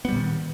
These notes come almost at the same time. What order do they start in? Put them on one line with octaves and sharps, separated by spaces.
B3 G3 A#2 D#3